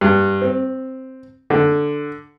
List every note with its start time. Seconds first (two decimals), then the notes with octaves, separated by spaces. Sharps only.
0.01 G2
0.41 C4
1.50 D3